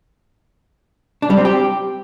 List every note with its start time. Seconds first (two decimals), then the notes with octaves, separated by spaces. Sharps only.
1.22 D4
1.30 G3
1.37 C4
1.45 G4